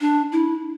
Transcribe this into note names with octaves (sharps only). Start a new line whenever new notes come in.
D4
E4